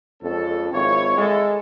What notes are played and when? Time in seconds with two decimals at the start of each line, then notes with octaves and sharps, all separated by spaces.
0.22 F2 G#3 C#4 A4
0.73 G#1 E4 F4 C#5
1.17 G#3 E4 A4